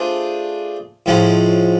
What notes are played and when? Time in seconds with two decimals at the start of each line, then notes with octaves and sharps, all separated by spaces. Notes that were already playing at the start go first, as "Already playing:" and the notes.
Already playing: A3 D4 F4 G#4 C5
1.06 A2 F3 G#3 C#4